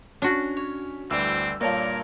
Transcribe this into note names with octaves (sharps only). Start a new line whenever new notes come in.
C#4 D4 F#4
C#5
D2 E3 G3 C4 E6
G2 A#2 A#3 A#4 C#5 A5